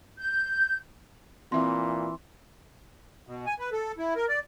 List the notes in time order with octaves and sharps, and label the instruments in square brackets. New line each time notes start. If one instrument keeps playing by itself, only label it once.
[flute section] G6
[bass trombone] A#2 [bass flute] E3 [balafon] C4 E5 [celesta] C6
[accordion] B2
G#5
B4
A4
E4
A#4
D5